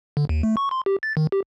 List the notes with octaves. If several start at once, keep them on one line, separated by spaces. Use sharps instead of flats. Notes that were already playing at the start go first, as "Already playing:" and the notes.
D3
D#2
A3
C#6
C6
G4
A6
D#3
G4